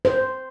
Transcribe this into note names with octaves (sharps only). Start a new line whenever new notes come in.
C5